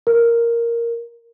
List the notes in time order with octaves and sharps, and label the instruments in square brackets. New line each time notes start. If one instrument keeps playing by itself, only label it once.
[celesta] A#4